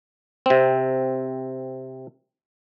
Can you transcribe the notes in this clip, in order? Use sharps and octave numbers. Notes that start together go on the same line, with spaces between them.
C3 C4